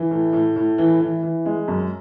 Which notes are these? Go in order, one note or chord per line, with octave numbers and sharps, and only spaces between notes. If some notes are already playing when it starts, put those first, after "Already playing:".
Already playing: E3
A2
A2
A2
E3
E3
E3
G#3
F#2